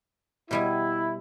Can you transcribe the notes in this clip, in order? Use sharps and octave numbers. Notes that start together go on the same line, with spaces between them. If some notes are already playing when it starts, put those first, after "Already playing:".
B2 G3 E4 G#5